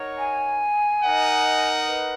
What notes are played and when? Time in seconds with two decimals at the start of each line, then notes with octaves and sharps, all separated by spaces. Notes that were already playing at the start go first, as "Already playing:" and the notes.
Already playing: D#4 A#4 C#5 F#5
0.18 G#5
1.02 D#4 A#4 D#5 F#5
1.87 B4